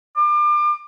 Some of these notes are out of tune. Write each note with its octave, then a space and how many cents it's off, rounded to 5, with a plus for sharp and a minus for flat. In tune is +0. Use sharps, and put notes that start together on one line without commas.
D6 +35